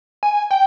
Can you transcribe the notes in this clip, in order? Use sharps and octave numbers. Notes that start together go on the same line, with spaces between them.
G#5
G5